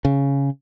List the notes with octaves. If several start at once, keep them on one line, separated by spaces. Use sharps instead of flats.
C#3